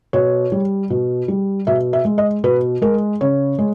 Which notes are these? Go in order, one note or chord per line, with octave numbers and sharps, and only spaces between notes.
B2 C#5
G3
B2
G3
B2 E5
E5
G#3
D#5
B2 B4
G#3 A#4
C#3 C#5
G#3